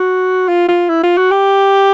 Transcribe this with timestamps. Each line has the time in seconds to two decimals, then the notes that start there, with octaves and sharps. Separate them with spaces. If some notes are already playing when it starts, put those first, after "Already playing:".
Already playing: F#4
0.48 F4
0.68 F4
0.89 E4
1.03 F4
1.17 F#4
1.31 G4